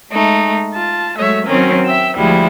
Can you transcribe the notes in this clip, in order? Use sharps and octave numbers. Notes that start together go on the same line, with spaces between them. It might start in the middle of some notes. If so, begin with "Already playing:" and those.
G#3 A3 D#4
F4 A5
F#3 G#3 A3 C#5 E5
D#3 F#3 C4 C#4 A#4
E5 G5 E6
D2 F3 G3 G#3 E4